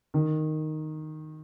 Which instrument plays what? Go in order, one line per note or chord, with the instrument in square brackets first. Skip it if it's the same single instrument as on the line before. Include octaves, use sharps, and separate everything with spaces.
[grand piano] D#3